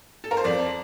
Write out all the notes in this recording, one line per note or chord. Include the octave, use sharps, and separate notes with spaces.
A4
A#4
C5
F2 D5